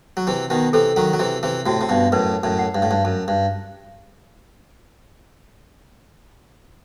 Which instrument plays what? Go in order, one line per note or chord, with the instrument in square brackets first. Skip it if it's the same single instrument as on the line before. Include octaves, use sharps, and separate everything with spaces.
[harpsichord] F#3
[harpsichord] C3 E3 [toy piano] A5
[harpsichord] B2 D#3
[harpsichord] C3 E3 [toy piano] A4
[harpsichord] D#3 F#3
F#3
[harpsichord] C3 E3 [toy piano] E5
[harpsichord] C3 E3
[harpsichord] A2 C3 [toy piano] F#4
[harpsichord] C3
G2 B2
[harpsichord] F#2 A2 [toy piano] B4
[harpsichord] F#2 A2
[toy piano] F#5
[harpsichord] G2
A2
G2
[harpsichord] F#2 [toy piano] A5
[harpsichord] G2